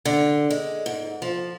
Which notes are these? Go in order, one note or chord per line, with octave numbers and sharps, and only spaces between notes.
D3
G#3
G#2
F3